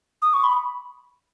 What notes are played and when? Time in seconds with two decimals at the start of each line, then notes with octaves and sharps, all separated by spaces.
0.22 D#6
0.34 C#6
0.44 B5